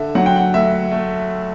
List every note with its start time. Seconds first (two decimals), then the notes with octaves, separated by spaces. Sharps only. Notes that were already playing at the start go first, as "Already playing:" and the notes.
Already playing: D3 E5
0.15 F#3 F#5
0.26 G5
0.36 F#5
0.54 D2 E5
0.91 A3